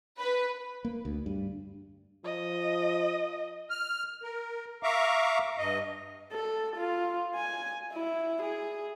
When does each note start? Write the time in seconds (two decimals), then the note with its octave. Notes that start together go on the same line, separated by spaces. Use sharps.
0.19 B4
0.85 A#3
1.05 D2
1.26 G2
2.25 F3 D#5
3.70 F6
4.23 A#4
4.83 E5 F5 A#5 C#6 D6
5.58 G2 D#5
6.32 A4
6.77 F4
7.35 G#5
7.94 E4
8.43 G#4